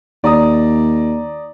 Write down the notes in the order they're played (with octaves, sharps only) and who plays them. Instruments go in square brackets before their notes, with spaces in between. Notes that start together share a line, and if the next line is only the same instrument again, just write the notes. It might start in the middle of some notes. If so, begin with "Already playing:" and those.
[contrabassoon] D#2 [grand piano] D5 A#5 D#6